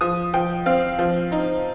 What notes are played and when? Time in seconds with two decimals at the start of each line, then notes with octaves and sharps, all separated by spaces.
0.01 F3 D#6
0.33 F3 G5
0.66 C4 F5
0.99 F3
1.32 D#4